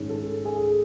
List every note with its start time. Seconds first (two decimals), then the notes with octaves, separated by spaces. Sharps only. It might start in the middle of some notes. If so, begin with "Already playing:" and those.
Already playing: G#2 D#3 G#3 C#4
0.09 A4
0.45 G#4